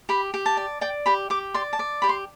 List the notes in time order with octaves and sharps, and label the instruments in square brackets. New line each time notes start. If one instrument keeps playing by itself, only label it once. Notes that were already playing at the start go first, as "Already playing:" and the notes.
[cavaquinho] G4 B5
G4
A5
D5
D5 G5
G4 B5
G4 D6
D5 C6
A5
D5
G4 B5
C6